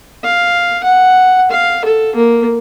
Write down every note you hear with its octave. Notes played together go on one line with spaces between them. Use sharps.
F5
F#5
F5
A4
A#3